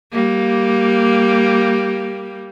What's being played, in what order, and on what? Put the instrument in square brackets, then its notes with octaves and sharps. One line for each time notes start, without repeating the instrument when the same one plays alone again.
[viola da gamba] G3 A#3